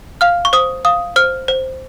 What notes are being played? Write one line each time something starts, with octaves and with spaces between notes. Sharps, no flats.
F5 F6
C#6
C5 D#6
F5 D#6
C5 F6
C5